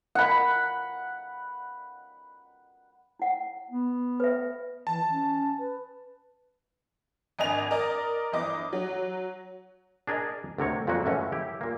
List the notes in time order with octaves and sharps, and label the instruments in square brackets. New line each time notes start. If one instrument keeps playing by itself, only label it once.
[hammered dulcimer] F#5 B5
[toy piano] E4 F#5
[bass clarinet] B3
[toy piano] B4 E5
[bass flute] E3 [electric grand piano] A5
[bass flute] C#4
B4
[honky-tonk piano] G#1 D4 D#5 G#5 F7
A#4 D5 D#5
G1 E3 D#5 D6
F#3
[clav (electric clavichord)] D4 G#4 A#4 D5 D#5
D2 C3 A#4 C#5
F2 A#2 F#3 A#3 F#4
F#2 A2 E3 G#3 C#4
E4 G4
A#2 A#3